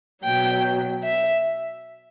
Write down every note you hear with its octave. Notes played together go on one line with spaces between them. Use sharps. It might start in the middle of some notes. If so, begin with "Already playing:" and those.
B2 F#3 G5
E5